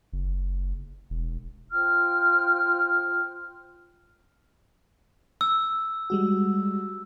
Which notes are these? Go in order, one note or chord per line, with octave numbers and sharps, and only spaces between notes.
F#1
E1
F4 C5 G5 F6
E6
G3 G#3 F#4